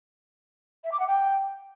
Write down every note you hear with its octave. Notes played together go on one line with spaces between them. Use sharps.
E5
D6
F#5
G5